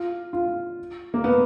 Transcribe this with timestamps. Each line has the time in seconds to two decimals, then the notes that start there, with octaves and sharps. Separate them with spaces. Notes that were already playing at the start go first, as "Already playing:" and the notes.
Already playing: F4
0.33 F4
1.14 A#3
1.24 B3